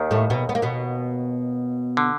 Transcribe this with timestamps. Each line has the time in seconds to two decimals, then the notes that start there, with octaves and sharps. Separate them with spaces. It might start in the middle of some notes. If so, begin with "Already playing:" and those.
Already playing: D#2 D#3
0.11 A2 A3
0.30 B2 B3
0.49 B3
0.55 A#3
0.62 B2 B3
1.97 D3